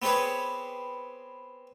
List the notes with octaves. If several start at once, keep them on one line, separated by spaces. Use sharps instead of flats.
B3 C4 G4 G#4 B4 C#5